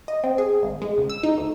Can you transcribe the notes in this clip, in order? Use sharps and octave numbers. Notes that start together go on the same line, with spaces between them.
D#5
C4
G#4
G#1
G#3
C#2
E6
D#4
D2